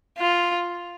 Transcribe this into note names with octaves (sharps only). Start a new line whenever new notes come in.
F4